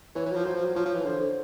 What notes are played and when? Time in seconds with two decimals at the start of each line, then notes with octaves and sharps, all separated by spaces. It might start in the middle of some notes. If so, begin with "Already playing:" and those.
0.15 E3 C#5
0.26 E3
0.31 F#3
0.35 F3
0.45 F#3 C5
0.55 F3
0.65 F#3
0.75 F3 C#5
0.85 F3
0.95 E3
1.05 D3 C5
1.20 D3